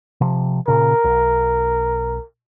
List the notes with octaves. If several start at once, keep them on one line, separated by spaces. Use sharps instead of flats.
C3 F3
A#2 C#3 A#4
B1